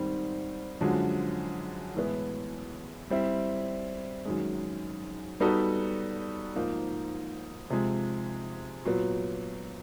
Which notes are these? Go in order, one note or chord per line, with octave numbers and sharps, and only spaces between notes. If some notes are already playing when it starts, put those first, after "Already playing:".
Already playing: G#2 D#3 G3 C4
F#2 D3 F3 G#3
A2 E3 G#3 B3
G3 C4 E4
F#2 D#3 G#3
G3 B3 D#4 F#4 A4
G#2 F3 A#3 D#4
C3 F3 G#3
A#2 F#3 B3